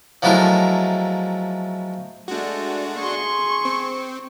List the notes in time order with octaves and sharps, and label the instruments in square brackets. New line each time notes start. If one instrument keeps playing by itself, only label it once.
[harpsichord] F3 F#3 G#3 A3 E4 A#4
[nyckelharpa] G#3 A3 [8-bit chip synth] D4 F#4
[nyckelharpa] G#4 C6 [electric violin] C#6
[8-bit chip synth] C4